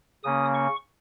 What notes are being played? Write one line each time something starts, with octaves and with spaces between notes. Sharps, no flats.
C#3 A#3 C#4 D#6
C#6